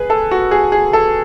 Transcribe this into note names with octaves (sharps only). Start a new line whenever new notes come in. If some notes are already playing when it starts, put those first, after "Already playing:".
Already playing: G#4 B4
A4
F#4
G#4
G#4
A4